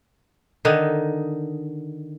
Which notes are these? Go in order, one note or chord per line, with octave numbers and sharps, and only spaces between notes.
D3 D#3 D#4